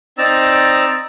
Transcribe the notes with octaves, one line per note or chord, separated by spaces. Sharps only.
C4 D#4 D5 A#5 E6